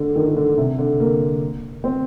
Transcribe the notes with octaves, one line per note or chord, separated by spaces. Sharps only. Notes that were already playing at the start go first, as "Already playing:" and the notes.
Already playing: D3
D#3
D#3
D3
C3
D3
A#3
C4